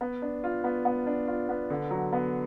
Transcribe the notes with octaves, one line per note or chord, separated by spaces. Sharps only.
B3
D4
F4
B3
B3
D4
F4
B3
D3
F#3
B3